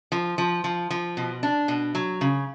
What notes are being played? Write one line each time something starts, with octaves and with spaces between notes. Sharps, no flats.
F3
F3
F3
F3
B2
D4
B2
F#3
C#3